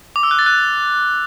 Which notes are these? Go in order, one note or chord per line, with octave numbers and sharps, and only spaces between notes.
D6
E6
F#6
A6
F#6